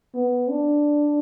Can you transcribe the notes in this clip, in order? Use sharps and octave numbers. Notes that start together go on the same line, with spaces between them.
B3
D4